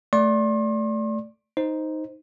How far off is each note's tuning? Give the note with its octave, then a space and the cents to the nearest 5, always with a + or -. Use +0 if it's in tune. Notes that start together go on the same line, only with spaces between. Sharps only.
A3 +0 D5 -15 C6 +40
D#4 +5 C5 +0